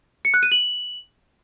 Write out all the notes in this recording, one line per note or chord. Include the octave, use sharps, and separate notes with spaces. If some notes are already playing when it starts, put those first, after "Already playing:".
C#7
F#6
D#7
F#7